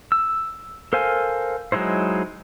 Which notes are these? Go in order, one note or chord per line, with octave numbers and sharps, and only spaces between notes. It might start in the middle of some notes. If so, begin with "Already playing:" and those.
E6
A4 A#4 C5 F5 G#5
F#3 G#3 D#4 E4 C5